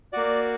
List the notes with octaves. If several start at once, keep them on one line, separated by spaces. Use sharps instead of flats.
A#3 F#4 D5